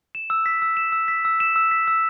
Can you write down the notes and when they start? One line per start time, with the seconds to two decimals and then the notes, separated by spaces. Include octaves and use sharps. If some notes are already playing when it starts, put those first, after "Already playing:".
0.15 E7
0.30 E6
0.46 B6
0.62 E6
0.77 E7
0.92 E6
1.08 B6
1.25 E6
1.40 E7
1.56 E6
1.71 B6
1.87 E6